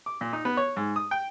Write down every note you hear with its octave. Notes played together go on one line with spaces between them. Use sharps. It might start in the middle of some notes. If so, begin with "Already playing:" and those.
D6
A#2
D#4
B3
C#5
G#2
D#6
G5